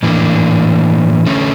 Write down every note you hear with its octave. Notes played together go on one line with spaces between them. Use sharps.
A2 E3 A#3 D4
D3 A3 C#4